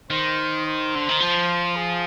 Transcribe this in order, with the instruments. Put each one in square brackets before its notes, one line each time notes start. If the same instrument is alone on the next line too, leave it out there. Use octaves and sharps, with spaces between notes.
[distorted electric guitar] D#3 [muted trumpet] C5
[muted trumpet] C5
[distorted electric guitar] D3
D#3
F3
[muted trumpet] G#4